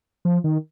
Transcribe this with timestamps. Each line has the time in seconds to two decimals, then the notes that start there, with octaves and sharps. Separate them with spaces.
0.25 F3
0.44 D#3